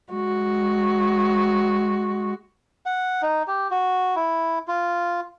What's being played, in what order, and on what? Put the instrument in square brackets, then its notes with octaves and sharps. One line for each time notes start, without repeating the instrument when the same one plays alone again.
[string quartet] G#3 F#4
[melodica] F#5
D#4
G4
F#4
E4
F4